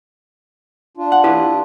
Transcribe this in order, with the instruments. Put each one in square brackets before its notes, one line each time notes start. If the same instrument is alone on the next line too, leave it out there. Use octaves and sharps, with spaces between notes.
[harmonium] D4 F4
[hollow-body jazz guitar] F#5
E4 G4 B4